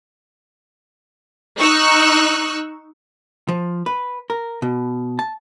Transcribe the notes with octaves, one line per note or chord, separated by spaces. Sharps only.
D#4 C#6 E6 F#6
F3
B4
A#4
B2
A5